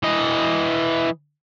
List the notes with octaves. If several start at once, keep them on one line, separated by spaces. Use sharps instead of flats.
E3 D#5